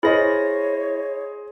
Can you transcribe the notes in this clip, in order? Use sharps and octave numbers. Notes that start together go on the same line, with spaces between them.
E4 G#4 C5 C#5 D#5 A#6